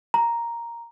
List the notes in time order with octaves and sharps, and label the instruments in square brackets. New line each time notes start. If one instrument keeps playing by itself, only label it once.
[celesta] A#5